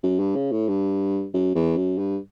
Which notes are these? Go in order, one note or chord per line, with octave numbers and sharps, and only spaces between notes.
F#2
G2
C#3
A2
G2
F#2
E2
F#2
G2